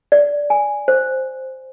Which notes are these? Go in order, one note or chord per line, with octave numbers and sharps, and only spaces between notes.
D5
G#5
C5